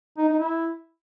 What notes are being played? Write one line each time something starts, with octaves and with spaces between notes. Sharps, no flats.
D#4
D#4
E4